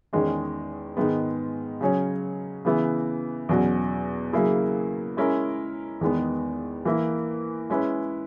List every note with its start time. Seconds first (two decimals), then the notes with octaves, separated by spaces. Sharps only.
0.13 E2 D#3 G#3 C#4
0.97 G#2 D#3 G#3 B3
1.81 C#3 F#3 C#4 G#4 C#5
2.65 C#3 E3 B3 E4
3.49 E2 B2 F#3 C#4 F#4
4.33 C#3 F#3 A#3 E4 G#4
5.17 G#3 C#4 E4 A#4
6.01 E2 D#3 G#3 B3
6.85 E3 A#3 E4
7.70 G#3 C#4 E4 B4